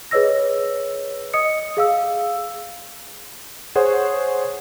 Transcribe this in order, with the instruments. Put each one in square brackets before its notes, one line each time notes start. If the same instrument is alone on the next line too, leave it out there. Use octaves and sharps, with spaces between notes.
[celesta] G#4 B4 C#5 D#5 E6 A#6
D#5 D#6 C#7
G#4 F5 E6
[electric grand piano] G#4 C5 C#5 F#5